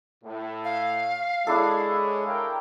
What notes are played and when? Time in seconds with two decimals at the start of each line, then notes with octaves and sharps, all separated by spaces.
0.24 A2
0.64 F5
1.47 G#3 D4 E4 G#4 A4 C#5
2.26 A#4 F5 G5